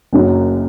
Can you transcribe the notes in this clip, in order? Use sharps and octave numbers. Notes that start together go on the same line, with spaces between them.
F#1 F#2 F#3